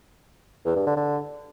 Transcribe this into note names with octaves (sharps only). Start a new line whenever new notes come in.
E2
G2
D3
D3